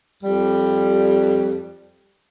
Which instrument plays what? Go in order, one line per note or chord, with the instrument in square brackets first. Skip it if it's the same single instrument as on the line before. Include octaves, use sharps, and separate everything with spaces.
[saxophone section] F2 G3